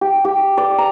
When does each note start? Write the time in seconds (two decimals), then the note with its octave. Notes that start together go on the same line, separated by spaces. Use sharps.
0.01 G4
0.25 G4
0.58 D5
0.78 A#5